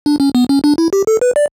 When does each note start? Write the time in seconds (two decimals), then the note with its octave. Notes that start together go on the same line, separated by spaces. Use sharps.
0.06 D4
0.20 C#4
0.35 B3
0.49 C#4
0.64 D4
0.78 E4
0.93 G4
1.07 A4
1.21 B4
1.36 D5